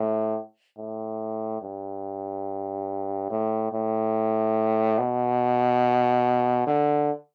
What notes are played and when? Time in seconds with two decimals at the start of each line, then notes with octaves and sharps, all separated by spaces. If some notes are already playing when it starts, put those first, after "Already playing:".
Already playing: A2
0.78 A2
1.62 G2
3.30 A2
3.72 A2
4.99 B2
6.67 D3